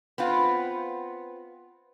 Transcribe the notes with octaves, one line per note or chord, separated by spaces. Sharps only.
B3 C4 F4